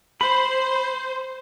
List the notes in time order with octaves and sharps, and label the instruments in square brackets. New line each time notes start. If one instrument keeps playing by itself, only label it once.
[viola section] C5 [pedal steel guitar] B5